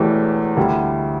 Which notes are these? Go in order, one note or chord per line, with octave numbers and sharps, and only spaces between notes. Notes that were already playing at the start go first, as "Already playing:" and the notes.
Already playing: E1 E2 E3 A3 G4
D2 D3 G3 E4